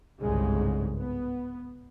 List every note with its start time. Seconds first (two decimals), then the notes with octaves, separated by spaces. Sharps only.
0.20 G1 C2 G#2 C#3 G#3
0.99 B3